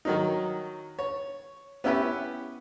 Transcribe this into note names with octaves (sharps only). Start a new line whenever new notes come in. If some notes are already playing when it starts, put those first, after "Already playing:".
D#3 F#3 D#4
C#5
B3 C#4 E4 G4 B4